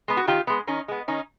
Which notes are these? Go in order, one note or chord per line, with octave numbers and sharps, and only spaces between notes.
G#3 B3
F#4
D#3 F4 G4
G#3 B3
D#3 C#4 D#4
G#3 B3
D#3 C#4 D#4